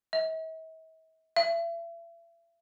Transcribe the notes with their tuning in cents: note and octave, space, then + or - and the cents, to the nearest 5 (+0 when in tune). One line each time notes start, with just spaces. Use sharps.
E5 -45
E5 +40